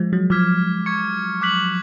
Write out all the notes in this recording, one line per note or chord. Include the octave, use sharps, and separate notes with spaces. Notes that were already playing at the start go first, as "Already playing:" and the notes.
Already playing: F3 G#3
F#3
F3 D6 F6 G#6 B6
C#6 G#6 C#7
D6 F#6 B6 F#7